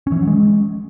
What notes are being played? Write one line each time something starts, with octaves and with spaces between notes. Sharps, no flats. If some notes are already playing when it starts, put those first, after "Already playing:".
C#4
E3
C#4
F#3
G#3